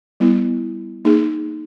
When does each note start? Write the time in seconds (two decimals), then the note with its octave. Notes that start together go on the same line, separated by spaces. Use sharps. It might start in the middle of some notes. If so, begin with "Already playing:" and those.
0.20 G3 B3 E4
1.05 A#3 D#4 G#4